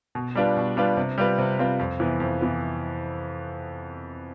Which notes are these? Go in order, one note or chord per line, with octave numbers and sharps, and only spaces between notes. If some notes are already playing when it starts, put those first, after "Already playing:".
B2
G3 D4 F4 B4
B2
G3 D4 F4 B4
C3
G3 C4 F4 B4
C3
G3 C4 F4 B4
F2
C3 E3 B3
F2
C3 E3 B3